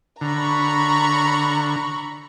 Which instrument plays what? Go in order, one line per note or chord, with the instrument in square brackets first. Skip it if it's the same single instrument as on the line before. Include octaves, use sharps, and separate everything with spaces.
[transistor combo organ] D3 [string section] A#5 B5 C#6